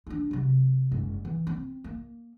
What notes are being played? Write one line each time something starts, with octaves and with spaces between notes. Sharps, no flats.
D4 E4
C3 F#3
F#1 G#2
E3
C4
A#3